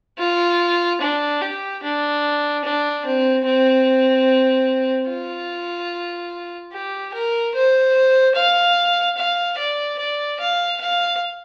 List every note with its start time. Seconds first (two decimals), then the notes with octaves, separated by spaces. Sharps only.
0.19 F4
1.01 D4
1.42 G4
1.83 D4
2.64 D4
3.05 C4
3.46 C4
5.09 F4
6.73 G4
7.14 A#4
7.54 C5
8.36 F5
9.17 F5
9.58 D5
9.99 D5
10.40 F5
10.81 F5